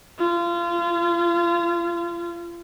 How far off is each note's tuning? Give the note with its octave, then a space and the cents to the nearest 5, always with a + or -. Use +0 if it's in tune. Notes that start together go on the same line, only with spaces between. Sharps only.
F4 -30